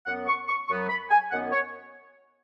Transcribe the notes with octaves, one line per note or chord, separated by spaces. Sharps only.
F#2 F#3 B3 F#5
C#6
C#6
F#2 F#3 B3 C#6
B5
G#5
F#2 D#3 B3 F#5
C#5